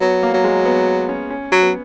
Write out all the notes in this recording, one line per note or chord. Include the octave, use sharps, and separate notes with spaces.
F#3 B3
A#3
F#3
G#3
B3
C#4
C#4
F#3
B3